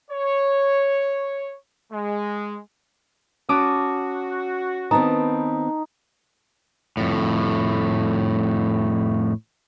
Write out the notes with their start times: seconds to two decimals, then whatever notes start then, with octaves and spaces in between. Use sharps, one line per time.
0.11 C#5
1.93 G#3
3.49 C#4 F#4 A5 D6 D#6
4.91 D#3 B3 C4 D#4 A5
6.97 F2 A2